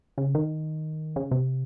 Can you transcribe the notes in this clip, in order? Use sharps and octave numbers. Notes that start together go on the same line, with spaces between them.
C#3
D#3
C#3
C3